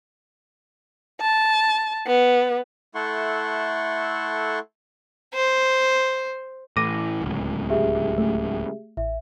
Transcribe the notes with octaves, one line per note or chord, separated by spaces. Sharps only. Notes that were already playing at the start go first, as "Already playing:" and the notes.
A5
B3
A3 E4 A4 F#5 C6 C#6
C5
A2 E3 D6 A#6 D#7
D1 C#2
G4 G#4 E5
A3
A1 E5